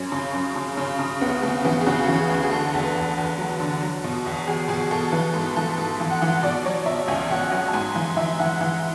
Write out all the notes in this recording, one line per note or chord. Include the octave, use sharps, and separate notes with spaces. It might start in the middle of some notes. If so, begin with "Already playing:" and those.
Already playing: F#2 C#4
C#3
F#2
C#3
C#3
C#3
D2 B3
C#3 B3
E3 B3
G#4
C#3 F#4
E3
G#4
D2
G#4
D3 A4
E2
B4
E2
E2
F#3
D3
F#3
B2
E2
E2 G#4
B2 G#4
B2 A4
E3 B4
G#2 A4
E3 A4
G#2 A4
E3
F#5
E3
B2 D5
F#3 C#5
B2 E5
C#2 G#5
B2 F#5
F#3 G#5
A5
G#2 G#5
E3 G#5
E3 E5
E3 F#5
E3